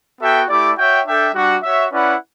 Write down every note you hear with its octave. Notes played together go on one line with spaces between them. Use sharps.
B3 F#4 A4 E5 G5
A3 E4 G4 D5
F#4 C#5 E5 G5
D4 A4 E5 G5
G3 D4 F#4
F#4 C#5 E5
C#4 E4 B4 D5 F#5